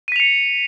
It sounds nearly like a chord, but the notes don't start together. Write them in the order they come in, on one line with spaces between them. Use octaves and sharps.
D#7 B6 F7 C#7